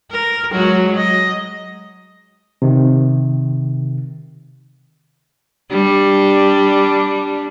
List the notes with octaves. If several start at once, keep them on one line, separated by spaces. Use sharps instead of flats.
A#4
F#3 G#3 F#4
D#5
C3 D#3
G3 D4